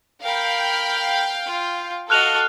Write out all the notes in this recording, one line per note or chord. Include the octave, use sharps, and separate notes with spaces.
A#4 F5 G5 B5
F4
F#4 A4 D#5 F5 F6 F#6 F7